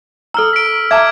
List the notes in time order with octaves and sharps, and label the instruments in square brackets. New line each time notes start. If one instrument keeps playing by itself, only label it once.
[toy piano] A4 A#5 [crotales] E6 F6
[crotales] B6 D7
[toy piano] E5 A5 A#5 [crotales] D6 G#6